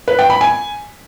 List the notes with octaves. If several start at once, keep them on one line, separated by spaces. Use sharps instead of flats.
B4
G5
B5
G#5